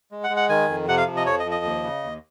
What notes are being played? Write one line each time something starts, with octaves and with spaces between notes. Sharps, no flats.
G#3
F#5
G#3
F#5
D#3 G#5
F2
C3 F#5
F5
F3
D#5
F2 C#5
D#5
F3
D#5
D#2
C#3
D#2